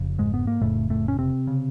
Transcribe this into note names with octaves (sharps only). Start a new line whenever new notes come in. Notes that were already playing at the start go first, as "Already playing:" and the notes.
Already playing: F1 F2 C#3
G#2 G#3
B3
A#3
F1 F2 A2 C#3 A3
A2 A3
C#4
C3 C4
C#3